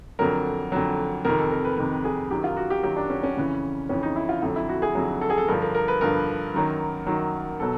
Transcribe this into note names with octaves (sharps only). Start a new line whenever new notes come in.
F2 D3 F#3 A#4
F2 D3 F#3
F2 C3 D#3 A#4
A4
A#4
B4
F2 C3 D#3
G#4
F#2 D#3 F#3 G4
F4
F#4
G4
F#2 D#3 F#3 G4
D4
C#4
C#4
F2 C#3 E3
F2 C#3 E3 C#4
D#4
E4
F4
F2 D3 F#3 F4
E4
F#4
G#4
F2 D3 F#3
A4
G#4
A4
G2 D3 F3 A#4
A#4
A#4
B4
G2 D3 F3 A#4
F#2 D#3 F#3
F#2 D#3 F#3
B2 F#3 A4